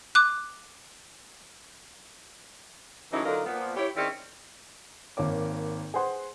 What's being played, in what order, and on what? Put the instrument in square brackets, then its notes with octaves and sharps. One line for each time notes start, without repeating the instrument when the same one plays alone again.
[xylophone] D6 F#6
[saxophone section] C#3 E3 F#3 A3 C#4 D#4
D3 F#3 D4 D#4 F4 A#4
A#2 F3 B3
E4 G4 C#5
D#3 C4 C#4 E4 G#4 D5
[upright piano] G#1 A#3 C#5 D6
G#4 B4 C5 F#5 C6